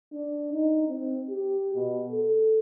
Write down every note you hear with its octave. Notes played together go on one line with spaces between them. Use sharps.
D4
D#4
C4
G4
B2
A4